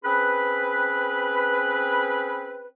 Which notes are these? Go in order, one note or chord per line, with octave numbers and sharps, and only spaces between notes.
C4 C#4 G#4 B4